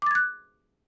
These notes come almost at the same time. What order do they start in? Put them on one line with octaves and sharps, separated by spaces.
D6 A6 G#6 F#6